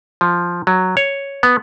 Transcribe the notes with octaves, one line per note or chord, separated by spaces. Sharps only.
F3
F#3
C#5
B3